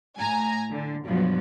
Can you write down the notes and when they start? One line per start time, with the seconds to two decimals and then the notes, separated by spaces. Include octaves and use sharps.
0.17 A2 G#5 A#5
0.70 D3
1.05 G2 B2 F3 F#3 B3